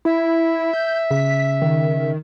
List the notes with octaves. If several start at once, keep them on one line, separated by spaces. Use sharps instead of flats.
E4 E5
G6
C#3 B6
D#3